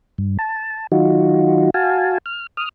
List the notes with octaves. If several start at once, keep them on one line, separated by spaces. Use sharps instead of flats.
G2
A5
D#3 F#3 D#4 F4 F#4
F#4 F5 G#5 A5
F6
D#6 F6